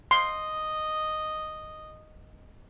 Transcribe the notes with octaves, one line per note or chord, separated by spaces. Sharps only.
D#5 C6